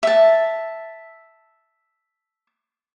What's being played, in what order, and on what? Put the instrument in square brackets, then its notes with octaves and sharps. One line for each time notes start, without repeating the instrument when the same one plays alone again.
[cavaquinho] E5 A5